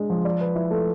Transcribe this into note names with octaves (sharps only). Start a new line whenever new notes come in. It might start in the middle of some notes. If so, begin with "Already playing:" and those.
Already playing: G#3 D4
F3
D5
B4
E4
A3